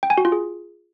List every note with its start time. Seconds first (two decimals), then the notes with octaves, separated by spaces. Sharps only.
0.03 G5
0.10 G#5
0.18 F#4
0.25 F4
0.32 G#4